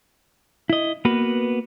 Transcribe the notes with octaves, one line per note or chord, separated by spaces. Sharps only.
E4 D#5
A#3 B3 F#4 B4